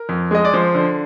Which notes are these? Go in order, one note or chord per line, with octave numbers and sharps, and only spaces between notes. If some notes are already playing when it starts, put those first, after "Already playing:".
Already playing: A#4
F2
G#3 D#5
D5
F3 C5
D3